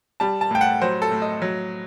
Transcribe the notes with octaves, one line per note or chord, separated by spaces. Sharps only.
G3 A5
A5
A2 G5
F#5
F#3 C5
A4
A2
D#5
F#3